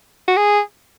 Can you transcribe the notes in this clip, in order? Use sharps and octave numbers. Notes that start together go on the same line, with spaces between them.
F#4
G#4